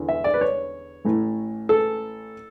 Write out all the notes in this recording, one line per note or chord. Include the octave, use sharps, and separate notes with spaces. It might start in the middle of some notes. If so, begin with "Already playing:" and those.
Already playing: E2 D3
E5
D5
B4
C#5
A1 A2 E3
A4